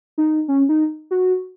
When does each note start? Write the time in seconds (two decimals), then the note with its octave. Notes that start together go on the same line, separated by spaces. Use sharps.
0.18 D#4
0.48 C#4
0.69 D#4
1.11 F#4